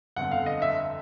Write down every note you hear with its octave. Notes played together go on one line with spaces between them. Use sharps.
G1 F2 D3 F#5
F5
D#5
E5